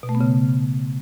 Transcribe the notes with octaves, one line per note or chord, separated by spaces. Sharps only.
B2
A3
B3
C#3